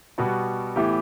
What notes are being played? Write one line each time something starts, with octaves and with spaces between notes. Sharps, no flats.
B2 G3 B3 F#4
A2 E3 B3 E4 G4